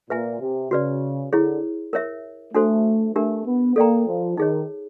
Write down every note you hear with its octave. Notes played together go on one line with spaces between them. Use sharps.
A#2 B4 E5 G#5
C3
C#3 F#4 B4 D5
D3 E4 G#4 C#5
A#4 C#5 E5
A3 D4 F#4 A4 C5
A3 D4 G4 A#4
B3
A#3 A4 D5 G5 A#5
F3
D#3 D#4 G#4 C#5